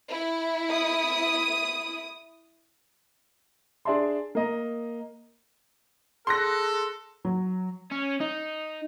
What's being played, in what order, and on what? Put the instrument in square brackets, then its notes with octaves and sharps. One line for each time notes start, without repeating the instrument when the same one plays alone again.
[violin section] E4
[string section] D#6
[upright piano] D4 G#4 D5 E5 A5 C6
A#3 D#5 A#5
[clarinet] G#4 [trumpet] A4 [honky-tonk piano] C6 F#6 A#6
[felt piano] F#3
[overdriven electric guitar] C#4
D#4